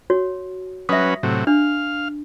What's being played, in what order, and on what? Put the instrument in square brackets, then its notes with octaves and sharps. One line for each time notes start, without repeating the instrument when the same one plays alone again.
[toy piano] F#4 C#5
[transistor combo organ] F#3 C#4 B4 [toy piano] E5 D#6
[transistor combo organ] A2 C3 F#3
[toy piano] D4 [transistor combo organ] F5